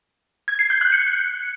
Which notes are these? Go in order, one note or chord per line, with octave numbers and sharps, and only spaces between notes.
G#6
C7
G6
F#6
C#7